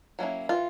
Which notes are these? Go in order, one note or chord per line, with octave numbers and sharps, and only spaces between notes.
F#3 A#3 C#4 E4
E3 F4